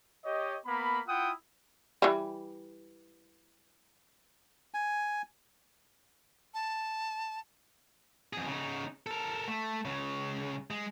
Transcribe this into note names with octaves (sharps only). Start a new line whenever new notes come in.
G4 C#5 D#5
A#3 B3 B5
E4 F4 F#5 G5 D#6
E3 G3
G#5
A5
F2 G#4
C#3 D#4
A4 A#4
A3
C#2 C#3
G#3